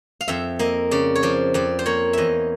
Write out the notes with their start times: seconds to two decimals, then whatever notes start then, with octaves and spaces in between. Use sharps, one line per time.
0.21 F5
0.28 F2 E5
0.59 A#3 D#5
0.91 C#3 D5
1.15 C#5
1.23 F3 D5
1.54 F2 D5
1.79 C5
1.86 A#3 C#5
2.13 E2 D#5 E5